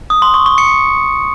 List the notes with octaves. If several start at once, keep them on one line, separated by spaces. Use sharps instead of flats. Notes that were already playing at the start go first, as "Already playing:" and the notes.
D#6
C6
C#6
C#6
C#7